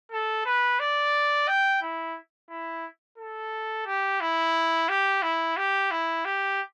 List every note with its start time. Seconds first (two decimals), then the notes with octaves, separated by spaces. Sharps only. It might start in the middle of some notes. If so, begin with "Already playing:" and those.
0.11 A4
0.45 B4
0.80 D5
1.48 G5
1.82 E4
2.50 E4
3.18 A4
3.86 G4
4.20 E4
4.89 G4
5.22 E4
5.57 G4
5.91 E4
6.25 G4